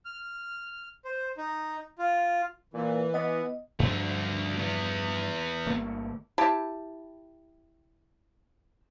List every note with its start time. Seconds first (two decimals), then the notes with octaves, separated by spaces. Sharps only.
0.05 F6
1.05 C5
1.37 D#4
1.98 F4
2.74 A#2 E3
3.14 B3 D#5
3.80 G2 D3 F3 F#3 A3
4.58 B3 E4
5.67 G1 A3 A#3
6.38 E4 G4 A5